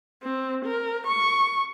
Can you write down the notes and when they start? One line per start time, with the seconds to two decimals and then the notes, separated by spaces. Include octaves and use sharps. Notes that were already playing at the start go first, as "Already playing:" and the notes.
0.23 C4
0.65 A#4
1.07 C#6